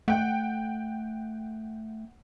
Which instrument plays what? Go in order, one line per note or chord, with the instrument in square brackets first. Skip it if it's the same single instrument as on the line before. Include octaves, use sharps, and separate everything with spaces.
[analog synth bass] A3 [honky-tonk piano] F#5 G5